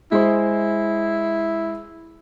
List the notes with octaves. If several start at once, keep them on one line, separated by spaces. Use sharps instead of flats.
G#3 E4 G#4 C5